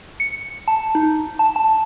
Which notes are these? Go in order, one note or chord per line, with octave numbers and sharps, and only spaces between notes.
C#7
A5
D#4
A5
A5